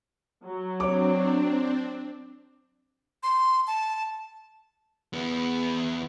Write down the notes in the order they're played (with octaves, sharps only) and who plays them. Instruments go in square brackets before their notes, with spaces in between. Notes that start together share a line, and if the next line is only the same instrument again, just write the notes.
[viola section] F#3
[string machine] C4 D4 [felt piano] C#5 D6
[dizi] C6
A5
[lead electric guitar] E2 B3